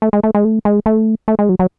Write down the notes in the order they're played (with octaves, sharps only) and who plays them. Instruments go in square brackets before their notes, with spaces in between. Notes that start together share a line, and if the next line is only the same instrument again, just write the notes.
[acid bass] A3
G#3
A3
G#3
A3
G#3
A3
A3
G#3
F#3
F#3